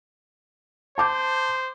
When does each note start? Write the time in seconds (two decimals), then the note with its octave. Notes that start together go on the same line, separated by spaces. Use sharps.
0.98 C5 A5 D6 G6